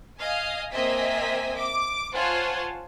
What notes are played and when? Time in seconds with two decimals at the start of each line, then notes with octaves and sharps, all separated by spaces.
0.19 D#5 F5 G#5
0.71 A#3 C4 D#5 E5 G#5 B6
1.59 D6
2.12 F4 C5 C#5 F#5 G#5 A5